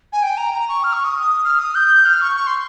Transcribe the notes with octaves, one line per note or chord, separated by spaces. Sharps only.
G#5
G5
A#5
A#5
C#6
F6
C#6
D#6
F6
D#6
G6
F6
C#6
C#6
C6